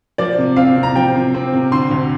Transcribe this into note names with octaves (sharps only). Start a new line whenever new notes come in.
F3 D5
C3
C4 F5
C3
A#5
F3 G5
C3
C4
C3
D3 C6
D2